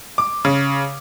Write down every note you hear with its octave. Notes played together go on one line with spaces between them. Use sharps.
D6
C#3